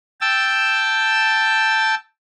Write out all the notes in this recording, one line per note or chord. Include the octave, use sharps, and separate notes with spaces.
G5 A5 E6